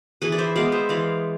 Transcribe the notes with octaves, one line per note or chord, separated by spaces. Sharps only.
E3 G#4 B4
D5
C5 E5
G#3 B3 D5 F5
C5 E5
E3 D5 F5